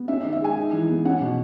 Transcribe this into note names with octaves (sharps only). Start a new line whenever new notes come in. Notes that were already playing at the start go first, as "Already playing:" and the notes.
Already playing: B3
C#4 E5
E5
D#3
E5
G#3 G#5
D#4
E3
B3
C#4 F#5
B2